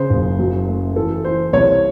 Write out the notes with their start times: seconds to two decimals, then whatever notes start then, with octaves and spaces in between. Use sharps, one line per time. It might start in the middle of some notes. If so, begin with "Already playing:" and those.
Already playing: C#3 C5
0.10 F#1
0.39 F#3
0.68 A3
0.96 E3 A4
1.24 E3 C5
1.53 C2 C#5